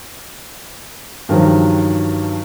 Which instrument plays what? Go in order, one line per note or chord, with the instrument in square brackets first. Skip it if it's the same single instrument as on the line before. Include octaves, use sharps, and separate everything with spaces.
[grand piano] G2 D#3 F3 F#3